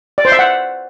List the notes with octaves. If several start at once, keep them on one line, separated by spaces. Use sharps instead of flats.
D5
C5
E5
F#5